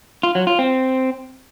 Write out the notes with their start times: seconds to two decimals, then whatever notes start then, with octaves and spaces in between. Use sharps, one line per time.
0.23 F4
0.35 F#3
0.47 F4
0.59 C4